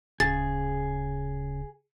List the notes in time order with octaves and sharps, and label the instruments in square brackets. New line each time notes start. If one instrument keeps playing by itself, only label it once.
[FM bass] D1 [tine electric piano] C#3 [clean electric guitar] G#4 [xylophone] A6